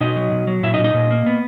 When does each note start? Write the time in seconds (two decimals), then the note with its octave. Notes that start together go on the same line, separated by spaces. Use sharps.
0.01 B2 D#4 D#5
0.16 F#3
0.32 B2
0.47 F#3
0.63 A#2 E4 E5
0.74 D#4 D#5
0.79 A#2
0.84 D#4 D#5
0.94 A#2
1.11 A#3
1.26 B3